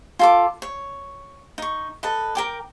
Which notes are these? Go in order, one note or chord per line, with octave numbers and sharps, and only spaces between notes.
F4 A4 D6
C#5
D#4 C#6
A4 B4 D#5
A#4 G5 D6